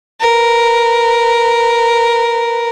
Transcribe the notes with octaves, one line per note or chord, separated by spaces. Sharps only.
A#4 B4